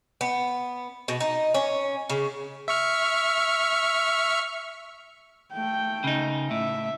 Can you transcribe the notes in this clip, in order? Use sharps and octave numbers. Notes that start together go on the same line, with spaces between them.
B3
B2
D#4
C#4
C#3
E5 C#6 F6
A3 G5
C#3 D#4
A2 E5